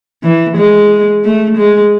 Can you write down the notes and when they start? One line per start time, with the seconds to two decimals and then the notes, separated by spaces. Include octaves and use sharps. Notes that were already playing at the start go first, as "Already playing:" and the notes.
0.23 E3
0.57 G#3
1.24 A3
1.57 G#3